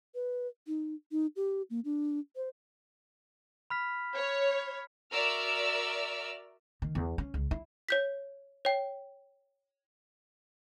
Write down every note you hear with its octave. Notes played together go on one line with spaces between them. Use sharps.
B4
D#4
D#4
G4
A#3
D4
C5
B5 F6 B6
C#5
F#4 A#4 D5 E5 E6 F6
D#3
E2
C#4
C#2
E4
C#5 G6 B6
C#5 G5